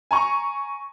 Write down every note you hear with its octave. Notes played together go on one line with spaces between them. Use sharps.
G#5 A#5 C#6